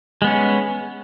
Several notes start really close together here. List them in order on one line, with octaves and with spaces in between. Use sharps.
G#3 B3 C#4